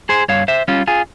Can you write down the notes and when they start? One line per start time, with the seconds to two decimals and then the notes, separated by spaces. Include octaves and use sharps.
0.09 G#4 C5
0.29 G2 C#5 F5
0.48 C5 E5
0.68 G3 C#4 F4
0.87 F4 G#4